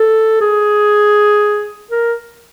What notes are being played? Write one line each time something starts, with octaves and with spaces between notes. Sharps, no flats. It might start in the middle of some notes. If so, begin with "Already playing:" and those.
Already playing: A4
G#4
A#4